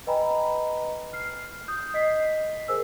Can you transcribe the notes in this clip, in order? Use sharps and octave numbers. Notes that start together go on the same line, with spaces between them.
B4 D#5 G5 G#5 A#5 B5
F6 C7
D#6 G6
D#5 B6 C7
G#4 A#4 C5 G#5 E6